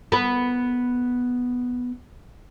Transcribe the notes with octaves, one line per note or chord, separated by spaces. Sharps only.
B3 B4